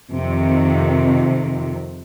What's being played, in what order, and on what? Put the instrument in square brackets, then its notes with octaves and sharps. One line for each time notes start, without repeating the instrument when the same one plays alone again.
[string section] F2 C3 D#3